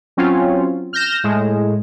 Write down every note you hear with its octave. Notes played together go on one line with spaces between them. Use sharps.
F#3 C4 C#4 F4
F6 G6 A#6 E7
A2 G#3